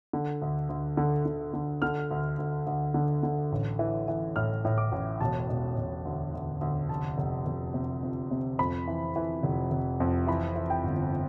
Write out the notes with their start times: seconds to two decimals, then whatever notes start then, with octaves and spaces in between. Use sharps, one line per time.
0.13 D3
0.42 D2
0.69 D2
0.97 D3
1.26 D3
1.54 D3
1.82 D3 F6
2.11 D2
2.39 D2
2.67 D2
2.94 D3
3.23 D3
3.52 A1
3.79 E3
4.08 E3
4.36 A2 F6
4.65 A2
4.78 D6
4.92 A1
5.21 E1 A5
5.49 E1
5.77 E1
6.05 D2
6.33 D2
6.61 D2
6.89 F1 A5
7.18 F1
7.46 F1
7.74 C3
8.03 F2
8.31 C3
8.59 F2 B5
8.87 E3
9.16 E3
9.43 F1
9.71 F1
10.00 F2
10.27 E3 B5
10.56 E3
10.70 G5
10.84 G1